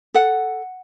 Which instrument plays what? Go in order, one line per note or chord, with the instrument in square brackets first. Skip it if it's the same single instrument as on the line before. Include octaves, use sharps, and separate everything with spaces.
[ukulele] A4 F#5